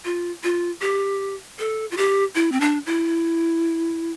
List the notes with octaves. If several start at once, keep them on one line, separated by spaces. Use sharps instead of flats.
F4
F4
G4
A4
F4
G4
E4
C4
D4
E4